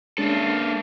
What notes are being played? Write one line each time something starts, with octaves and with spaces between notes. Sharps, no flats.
G#3 A#3 C#4 D4 A4